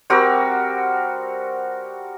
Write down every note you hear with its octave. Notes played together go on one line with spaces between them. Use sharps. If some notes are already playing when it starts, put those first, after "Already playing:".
G3 C4 F#4 A#4